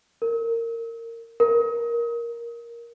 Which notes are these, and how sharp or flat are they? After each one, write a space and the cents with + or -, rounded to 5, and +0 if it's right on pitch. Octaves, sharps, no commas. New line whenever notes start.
A#4 -20
A#4 +10